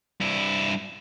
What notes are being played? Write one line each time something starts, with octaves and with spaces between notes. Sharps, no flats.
G2 E4